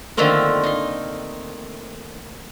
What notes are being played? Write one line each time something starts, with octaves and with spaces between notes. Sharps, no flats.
D3 D#3 F3 A3 A#3 C4
D#4 C6